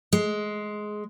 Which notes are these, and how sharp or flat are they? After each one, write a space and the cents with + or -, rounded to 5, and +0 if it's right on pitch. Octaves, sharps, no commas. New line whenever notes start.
G#3 +15